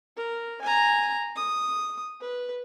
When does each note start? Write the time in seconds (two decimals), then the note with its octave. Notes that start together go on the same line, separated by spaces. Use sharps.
0.17 A#4
0.62 G#5 A#5
1.36 D#6
2.21 B4